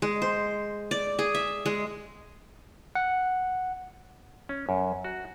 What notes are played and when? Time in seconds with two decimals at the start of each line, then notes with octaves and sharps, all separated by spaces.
0.02 G#3
0.22 C5
0.91 D5
1.19 G#4
1.35 E5
1.66 G#3
2.95 F#5
4.49 C#4
4.69 F#2
5.04 F#4